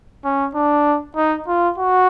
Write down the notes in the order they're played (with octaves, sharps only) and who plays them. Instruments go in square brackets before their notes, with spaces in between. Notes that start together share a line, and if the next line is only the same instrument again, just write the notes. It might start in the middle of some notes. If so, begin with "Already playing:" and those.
[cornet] C#4
D4
D#4
F4
F#4